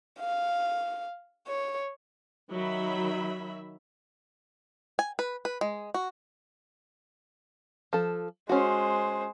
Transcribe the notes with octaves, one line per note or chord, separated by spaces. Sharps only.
F5
C#5
D#3 F#3 E5 B5
G#5
B4
B4
G#3
F#4
F3 A4
G#3 C#4 F#4 C5